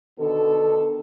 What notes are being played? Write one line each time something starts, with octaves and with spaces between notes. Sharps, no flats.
B2 D3 D#3 A4